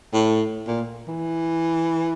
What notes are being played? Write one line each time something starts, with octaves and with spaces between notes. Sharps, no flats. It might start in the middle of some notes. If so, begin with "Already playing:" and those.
A2
A#2
E3